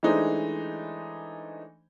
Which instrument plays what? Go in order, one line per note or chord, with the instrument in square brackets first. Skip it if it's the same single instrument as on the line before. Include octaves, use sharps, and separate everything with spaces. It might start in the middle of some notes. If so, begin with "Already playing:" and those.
[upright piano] E3 G#3 A3 D4 D#4 C5